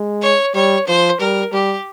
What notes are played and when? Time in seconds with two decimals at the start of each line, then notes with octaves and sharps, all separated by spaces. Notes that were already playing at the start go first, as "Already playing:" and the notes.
Already playing: G#3
0.22 C#5
0.54 G3 C#5
0.87 F3 C5
1.20 G3 A#4
1.53 G3 G4